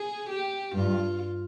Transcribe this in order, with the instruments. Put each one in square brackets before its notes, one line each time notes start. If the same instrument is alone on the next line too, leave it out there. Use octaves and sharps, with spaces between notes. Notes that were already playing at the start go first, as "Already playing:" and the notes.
Already playing: [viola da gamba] G#4
G4
[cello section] G2 [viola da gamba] F4